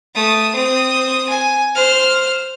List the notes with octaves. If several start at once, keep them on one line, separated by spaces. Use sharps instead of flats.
A3 D#6
C4 D#6
G#5
C5 F6